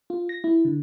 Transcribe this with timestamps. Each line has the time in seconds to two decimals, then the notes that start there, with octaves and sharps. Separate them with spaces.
0.10 F4
0.29 A#6
0.44 E4
0.65 D3